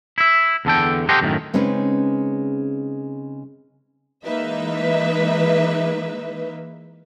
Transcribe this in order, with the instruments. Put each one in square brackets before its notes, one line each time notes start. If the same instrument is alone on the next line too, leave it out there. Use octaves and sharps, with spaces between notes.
[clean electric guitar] E4 E5
E2 D3 A4 G5
G4 A4 C5 D#5 F#5 G5
F#2 A2 D3 D#3
[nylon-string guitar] C#3 G#3 C4 C#4 D#4 B4
[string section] E3 G#3 A#3 D#4 B4 E5